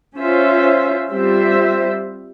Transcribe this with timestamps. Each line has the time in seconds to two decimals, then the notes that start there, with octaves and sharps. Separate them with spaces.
0.16 C#4 F4 C5 E5
1.10 G3 C4 F4 C5 E5